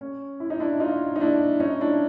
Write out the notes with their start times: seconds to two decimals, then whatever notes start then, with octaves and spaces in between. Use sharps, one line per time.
0.01 C#4
0.40 E4
0.50 D#4
0.60 D4 E4
0.80 D#4 F4
1.16 D#4
1.20 D4 E4
1.60 C#4 D#4
1.80 D4 E4